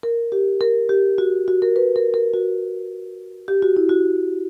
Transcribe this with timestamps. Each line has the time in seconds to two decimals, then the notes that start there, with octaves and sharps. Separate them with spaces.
0.03 A#4
0.32 G4
0.61 A#4
0.89 G4
1.18 F#4
1.48 F#4
1.62 A#4
1.76 B4
1.96 A#4
2.14 A#4
2.34 F#4
3.48 G4
3.62 F#4
3.77 E4
3.89 F#4